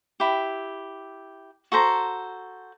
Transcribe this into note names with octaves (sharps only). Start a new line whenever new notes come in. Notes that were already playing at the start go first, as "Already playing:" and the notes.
E4 G4
F#4 A4 C5 A#5